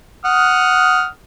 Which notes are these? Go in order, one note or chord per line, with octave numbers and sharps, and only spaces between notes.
F#5 D#6 F6